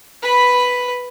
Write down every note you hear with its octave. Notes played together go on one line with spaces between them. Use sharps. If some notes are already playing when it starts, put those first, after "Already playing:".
B4 B5